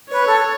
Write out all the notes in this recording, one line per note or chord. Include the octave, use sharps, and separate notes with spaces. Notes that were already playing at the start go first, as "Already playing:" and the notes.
B4 C#5
A4